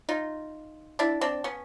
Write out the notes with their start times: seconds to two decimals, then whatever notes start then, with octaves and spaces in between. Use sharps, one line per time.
0.09 D#4 F4
0.99 D4 E4
1.21 C4 D4
1.44 B3 C#4